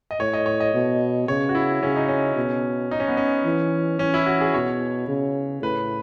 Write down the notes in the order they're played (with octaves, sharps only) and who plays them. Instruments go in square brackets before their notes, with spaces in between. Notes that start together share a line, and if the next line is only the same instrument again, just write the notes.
[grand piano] D#5
[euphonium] A2 [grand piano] C#5
[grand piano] D#5
C#5
D#5
[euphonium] B2
[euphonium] C#3 [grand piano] C#5
[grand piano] F#4
E4
[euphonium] C#3 [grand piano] C#4
[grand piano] D#4
C#4
[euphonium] B2
[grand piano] D#4
C#4
B3
C#4
[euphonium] E3
[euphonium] E3 [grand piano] C#4
[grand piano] E4
F#4
G#4
[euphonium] B2 [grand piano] C#5
[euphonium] C#3
[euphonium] A2 [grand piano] B4